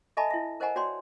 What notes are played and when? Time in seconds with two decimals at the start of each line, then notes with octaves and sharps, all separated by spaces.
0.17 A4 D#5 E5 G#5 A5 B5
0.30 E4 E5
0.60 A#4 C5 D#5 F#5 G#5 A#5
0.76 F#4 C#5 D5 G5 C6